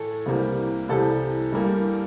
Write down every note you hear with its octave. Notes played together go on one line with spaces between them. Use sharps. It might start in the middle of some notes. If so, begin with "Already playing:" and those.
Already playing: A2 E3 A3 A4
C2 C3 E3 G3 A#3
C2 C3 E3 G3 A4
G2 E3 G3 A#3